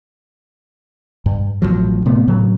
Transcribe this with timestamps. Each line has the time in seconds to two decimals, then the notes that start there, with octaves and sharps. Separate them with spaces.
1.26 G2
1.62 A1 A#2 F3 F#3
2.05 A2 C3 A3 B3
2.27 A2 C#3 F#3